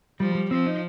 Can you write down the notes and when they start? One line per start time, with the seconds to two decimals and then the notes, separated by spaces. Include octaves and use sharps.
0.20 F3 G3
0.35 G3
0.51 F3 C4
0.66 D#4